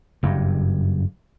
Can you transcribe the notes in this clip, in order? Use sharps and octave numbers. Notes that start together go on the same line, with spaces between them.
F#1 G2